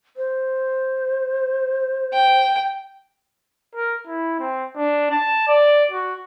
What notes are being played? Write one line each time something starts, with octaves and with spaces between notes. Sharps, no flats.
C5
G5
A#4
E4
C4
D4
A5
D5
F#4